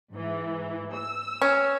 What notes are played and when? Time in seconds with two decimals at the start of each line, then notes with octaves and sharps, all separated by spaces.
0.11 G#2 E3
0.94 E6
1.42 C#4